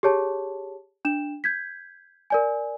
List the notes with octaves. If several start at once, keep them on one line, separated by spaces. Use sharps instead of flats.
G4 G#4 C#5 A5
D4 E7
G6 G#6 B6
A#4 D5 G#5